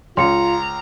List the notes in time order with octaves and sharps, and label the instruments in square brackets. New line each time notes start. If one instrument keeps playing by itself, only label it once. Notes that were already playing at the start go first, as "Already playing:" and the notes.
[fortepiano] C#2 [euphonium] F4 [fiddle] A#5 [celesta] C6 C#7